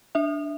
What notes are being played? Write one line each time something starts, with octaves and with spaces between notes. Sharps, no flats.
D4 E5